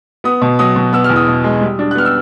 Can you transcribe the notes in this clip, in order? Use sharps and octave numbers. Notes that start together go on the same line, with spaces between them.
B3 D#6
B2
F#3 D#6
B2
B3 E6
F6
E2
D#6
B2
G#3
G3
D4
F#6
B3 F6
E6